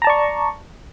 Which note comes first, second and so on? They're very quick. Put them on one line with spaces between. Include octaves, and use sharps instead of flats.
A#5 A5 D5 C#6